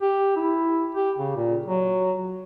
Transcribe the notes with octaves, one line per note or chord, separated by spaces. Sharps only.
G4
E4
G4
C#3
A#2
F#3